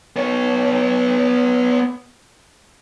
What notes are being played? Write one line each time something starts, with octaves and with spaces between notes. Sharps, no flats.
B3 C#5